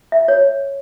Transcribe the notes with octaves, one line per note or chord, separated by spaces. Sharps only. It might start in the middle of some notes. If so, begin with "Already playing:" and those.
E5
C#5